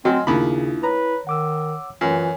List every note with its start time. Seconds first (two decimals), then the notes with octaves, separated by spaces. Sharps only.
0.05 F#3 C4 D#5 G#5 C6 F6
0.27 D#2 C#3 D4 E4 F4 B5
0.83 B4 C#5 A#5
1.27 D#3 F#5 D6 E6
2.01 F#2 E3 F4 C#5 G#5